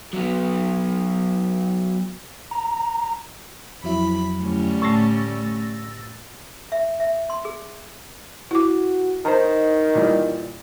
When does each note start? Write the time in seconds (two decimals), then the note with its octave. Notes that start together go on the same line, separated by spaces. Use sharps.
0.13 F#3 B3
2.51 A#5
3.84 F2 F#3 E4 B5
4.41 D2 G3 C#4
4.82 A2 A3 E6 A6 A#6
6.72 E5
7.00 E5
7.30 C6
7.45 G#4
8.51 E4 F#4 D6
9.25 D#3 D#4 C5 A#5
9.95 A#2 E3 G3